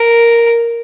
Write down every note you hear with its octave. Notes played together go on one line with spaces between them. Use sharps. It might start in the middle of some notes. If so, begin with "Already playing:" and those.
Already playing: A#4